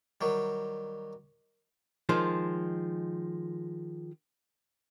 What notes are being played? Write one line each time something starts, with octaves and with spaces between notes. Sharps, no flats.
D#3 F#3 G3
D#3 F3 G#3